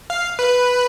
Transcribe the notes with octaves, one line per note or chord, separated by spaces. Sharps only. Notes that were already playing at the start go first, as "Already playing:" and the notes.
F5
B4